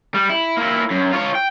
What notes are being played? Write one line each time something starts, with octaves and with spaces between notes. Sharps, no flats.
G3
E4
A#3 E4
F#2
F4 C#5
G5